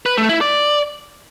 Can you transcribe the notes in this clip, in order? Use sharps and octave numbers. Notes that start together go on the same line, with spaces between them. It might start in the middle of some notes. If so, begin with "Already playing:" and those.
B4
A3
E4
D5